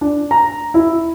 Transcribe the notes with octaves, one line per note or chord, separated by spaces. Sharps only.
D4
A#5
E4